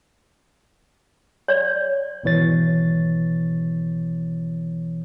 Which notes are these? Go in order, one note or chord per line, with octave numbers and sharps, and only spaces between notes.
C#5 D5
G#1 B2 E3 C#5 A6